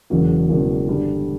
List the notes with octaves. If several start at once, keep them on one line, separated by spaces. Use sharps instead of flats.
E1 E2 C#3 F#3 A#3
E1 E2 C#3 F#3 A#3
G2 D3 G3